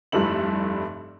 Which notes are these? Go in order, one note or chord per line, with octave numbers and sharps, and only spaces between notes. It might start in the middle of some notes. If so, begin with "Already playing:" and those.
F1 G2 G3 A3 E4 F#7